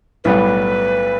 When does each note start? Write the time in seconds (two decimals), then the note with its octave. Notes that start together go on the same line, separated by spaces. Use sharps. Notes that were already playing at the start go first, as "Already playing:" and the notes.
0.24 B1 A2 G3 B3 B4